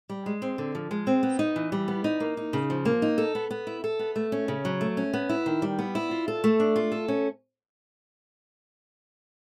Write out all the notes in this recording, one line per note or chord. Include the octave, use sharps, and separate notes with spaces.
G3
G#3
C4
D3
F3
G#3
C4
B3
D#4
E3
G3
B3
D#4
A#3
D#4
C#3
F3
A#3
D#4
A4
B3
B3
E4
A4
B3
A3
C#4
C#3
F#3
A3
C#4
B3
E4
D#3
G3
B3
E4
F4
A4
A3
D4
F4
A4
C#4